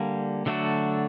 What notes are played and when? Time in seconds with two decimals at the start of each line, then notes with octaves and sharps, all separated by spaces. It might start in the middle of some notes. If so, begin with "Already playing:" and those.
Already playing: D3 G3 A#3
0.46 D3 F#3 A3 D4 F#4